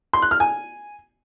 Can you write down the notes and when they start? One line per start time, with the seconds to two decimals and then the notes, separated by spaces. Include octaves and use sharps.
0.13 C6
0.22 F#6
0.31 F6
0.40 G#5